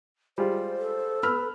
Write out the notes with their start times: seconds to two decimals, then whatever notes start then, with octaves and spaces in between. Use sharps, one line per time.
0.38 G3 G#3 F4 C5
0.78 A4
1.23 B4 B5 E6 F6